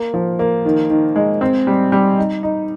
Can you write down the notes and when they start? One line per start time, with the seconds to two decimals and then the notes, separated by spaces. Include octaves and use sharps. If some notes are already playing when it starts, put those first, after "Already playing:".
Already playing: A#3
0.14 F3
0.39 A#3
0.65 D#3
0.90 D#3
1.16 G#3
1.41 C4
1.67 G3
1.92 G3
2.18 D#4
2.43 D#4